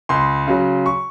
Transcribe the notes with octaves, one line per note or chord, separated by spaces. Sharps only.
C#2 C6
C#3 F#3
C#6